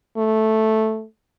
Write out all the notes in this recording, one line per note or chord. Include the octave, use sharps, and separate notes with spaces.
A3